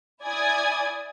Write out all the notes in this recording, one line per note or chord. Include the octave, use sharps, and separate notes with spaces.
E4 D5 G#5 D#6 G#6